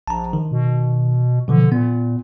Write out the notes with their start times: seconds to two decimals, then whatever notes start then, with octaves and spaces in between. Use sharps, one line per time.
0.07 A#1 A5 A#5
0.33 D#3
0.52 B2
1.48 B2 D3 E3 F3
1.72 A#2 B3